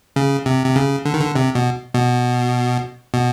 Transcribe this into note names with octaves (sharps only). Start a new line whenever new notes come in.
C#3
C3
C3
C#3
D3
D#3
D3
C3
B2
B2
B2